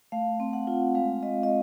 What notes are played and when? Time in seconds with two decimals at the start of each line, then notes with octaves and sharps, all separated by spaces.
0.12 A3 F5
0.40 C4
0.53 F#5
0.67 F4
0.95 G#3 F5
1.23 G#3 D#5
1.43 D#5